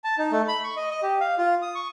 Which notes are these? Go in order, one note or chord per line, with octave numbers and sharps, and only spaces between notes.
A5
D#4
A3
B5
C#6
D#5
D#5
G4
F5
F4
D#6
C#6